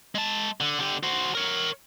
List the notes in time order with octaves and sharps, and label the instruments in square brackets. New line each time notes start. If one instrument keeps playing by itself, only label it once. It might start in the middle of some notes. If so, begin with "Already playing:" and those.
[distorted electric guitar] G#3 A5
D3
D3 G4
F#4 C5
A#4 C#5